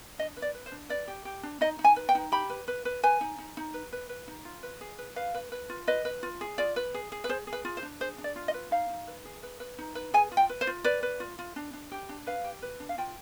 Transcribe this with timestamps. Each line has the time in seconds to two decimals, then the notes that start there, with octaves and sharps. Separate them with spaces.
0.18 D4 D#5
0.37 B4
0.42 D5
0.54 B4
0.66 C5
0.72 D4
0.89 B4 D5
1.08 G4
1.25 G4
1.43 D4
1.61 D#4 D#5
1.79 D#4
1.84 G#5
1.96 B4
2.09 G5
2.15 D#4
2.32 G4 B5
2.50 B4
2.68 B4
2.85 B4
3.03 B4 G#5
3.21 D#4
3.38 D#4
3.57 D#4
3.74 B4
3.93 B4
4.09 B4
4.28 D#4
4.45 F4
4.63 B4
4.81 G#4
4.98 B4
5.16 B4 F5
5.35 B4
5.52 B4
5.70 F4
5.87 B4 D#5
6.05 B4
6.23 F4
6.41 G#4
6.58 F4 D5
6.76 B4
6.94 G#4
7.12 G#4
7.24 B4
7.29 G#4 C5
7.47 G#4
7.53 B4
7.65 F4
7.77 C5
7.83 D4
8.00 G#4 C5
8.18 D4
8.24 D5
8.36 F4
8.48 D#5
8.54 B4
8.71 D#4 F5
8.89 D#4
9.07 B4
9.25 G#4
9.43 B4
9.60 B4
9.78 D#4
9.95 B4
10.14 G#4 G#5
10.32 F4
10.37 G5
10.49 B4
10.61 C5
10.67 F4
10.84 B4 D5
11.03 B4
11.20 F4
11.39 F4
11.56 D4
11.73 D4
11.92 G4
12.09 D4
12.27 B4 F5
12.44 G4
12.62 B4
12.80 D4
12.89 F5
12.98 F4 G5